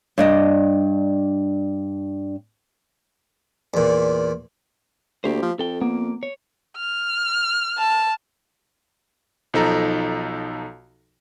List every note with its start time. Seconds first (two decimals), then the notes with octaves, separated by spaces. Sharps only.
0.18 G2 D4 D#5
3.74 E2 A#2
5.24 D2 A#3 G4 C5
5.42 F3
5.59 F2 A4 G5
5.81 A#3 B3
6.23 C#5
6.76 F6
7.78 A5
9.54 B1 F3 D#4 A4 A#5